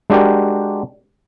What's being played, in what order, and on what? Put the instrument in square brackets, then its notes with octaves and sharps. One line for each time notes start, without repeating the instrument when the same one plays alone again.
[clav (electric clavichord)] G#3 D4 F#4 G4 A#4